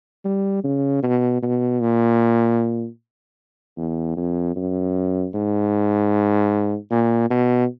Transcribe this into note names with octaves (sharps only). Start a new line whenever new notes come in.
G3
C#3
B2
B2
A#2
E2
F2
F#2
G#2
A#2
B2